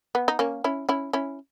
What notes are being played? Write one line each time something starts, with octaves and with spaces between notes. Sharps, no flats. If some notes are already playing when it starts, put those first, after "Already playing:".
B3
D#4
A#3 C#4
C#4 E4
C#4 E4
C#4 E4